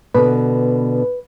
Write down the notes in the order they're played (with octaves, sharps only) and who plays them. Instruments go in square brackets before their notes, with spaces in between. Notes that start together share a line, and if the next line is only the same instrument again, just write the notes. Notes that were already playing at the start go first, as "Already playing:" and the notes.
[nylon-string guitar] B2 D3 [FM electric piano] B4